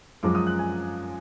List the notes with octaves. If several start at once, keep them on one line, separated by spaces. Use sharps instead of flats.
F#2 F3 G#3 D6
D#6
F#6
G#5